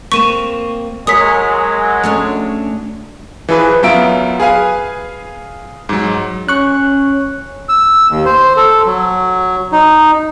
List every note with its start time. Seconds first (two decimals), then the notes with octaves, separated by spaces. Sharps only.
0.12 A#3 C4 C#6 D#7 E7
1.07 F#3 G#3 A#4 C#5 D#6 B6
2.03 A3 C#4 D4
3.49 E3 F3 G#4 B4
3.83 F#2 F#3 B3 F4 E5 D7
4.40 G#4 B4 F5 G#5
5.89 G#2 F#3
6.49 C#4 C#6 F#6
7.69 E6
8.10 D#2
8.26 C5
8.56 A4
8.86 F#3
9.72 D#4